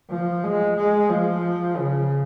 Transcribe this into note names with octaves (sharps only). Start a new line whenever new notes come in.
F3
G#3
G#3
F3
C#3